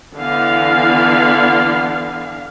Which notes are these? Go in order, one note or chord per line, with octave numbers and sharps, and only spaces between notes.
D3 E3 B3 F5